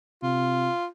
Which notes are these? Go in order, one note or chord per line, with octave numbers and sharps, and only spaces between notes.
C3 F4